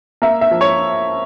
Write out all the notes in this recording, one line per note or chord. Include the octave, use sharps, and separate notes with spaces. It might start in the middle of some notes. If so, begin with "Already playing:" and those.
A#3 E5
E5
F3
C#5